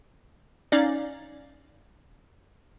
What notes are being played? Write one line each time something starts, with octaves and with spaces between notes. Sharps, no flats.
C#4 D#4 D5 F5